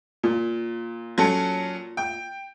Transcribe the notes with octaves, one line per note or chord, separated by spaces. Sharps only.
A#2
F#3 C#4 A4
G5